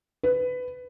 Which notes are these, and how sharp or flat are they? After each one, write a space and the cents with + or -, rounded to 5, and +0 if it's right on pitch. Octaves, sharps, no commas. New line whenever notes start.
B4 +10